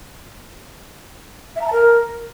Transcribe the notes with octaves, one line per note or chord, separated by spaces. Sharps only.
E5
A#5
A5
A#4